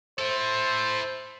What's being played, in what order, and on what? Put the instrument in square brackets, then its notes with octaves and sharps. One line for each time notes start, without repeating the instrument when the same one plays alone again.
[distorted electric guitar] E4 A4 [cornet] C5